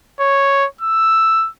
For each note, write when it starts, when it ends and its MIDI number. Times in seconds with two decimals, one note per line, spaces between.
0.20 0.66 73
0.81 1.49 88